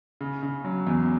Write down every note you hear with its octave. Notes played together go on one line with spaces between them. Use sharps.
C#3
C#3
F#3
E2